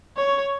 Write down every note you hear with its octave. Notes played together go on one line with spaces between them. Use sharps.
C#5